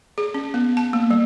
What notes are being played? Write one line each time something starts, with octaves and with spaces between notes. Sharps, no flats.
G#4
C#4
B3
A5
A#3
G3